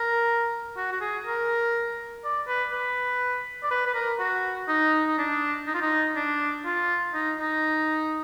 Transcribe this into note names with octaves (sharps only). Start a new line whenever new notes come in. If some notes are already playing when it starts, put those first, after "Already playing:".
Already playing: A#4
F#4
F#4
G#4
A#4
D5
B4
B4
D5
B4
B4
A#4
F#4
D#4
D#4
D4
D#4
F4
D#4
D4
F4
D#4
D#4